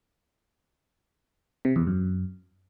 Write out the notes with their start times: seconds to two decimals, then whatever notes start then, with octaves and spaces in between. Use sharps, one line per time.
1.65 C3
1.76 E2
1.87 F#2